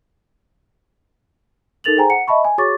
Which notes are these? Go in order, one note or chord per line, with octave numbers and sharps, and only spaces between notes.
D#4 A4 A#4 A6 F7 F#7
G#4 C5 G5 G#5 A#5
F#5 C#7
D#5 E5 A5 B5 C#6
G#5
F#4 G#4 C#5 C#6 D6 A6